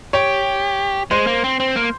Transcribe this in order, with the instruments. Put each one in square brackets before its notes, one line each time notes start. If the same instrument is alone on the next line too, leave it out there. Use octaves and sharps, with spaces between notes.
[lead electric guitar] G4 [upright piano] C#5
[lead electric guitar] G#3 [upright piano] C5
[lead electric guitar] A#3
C4
C4
A#3